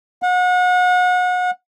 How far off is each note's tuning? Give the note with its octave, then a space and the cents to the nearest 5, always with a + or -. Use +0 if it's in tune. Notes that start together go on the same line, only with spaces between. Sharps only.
F#5 -35